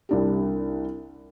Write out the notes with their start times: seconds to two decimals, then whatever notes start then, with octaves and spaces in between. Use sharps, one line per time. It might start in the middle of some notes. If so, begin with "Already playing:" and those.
0.09 C2 D4 G4